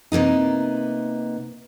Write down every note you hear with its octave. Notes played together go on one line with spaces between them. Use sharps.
C3 A#3 B3 D#4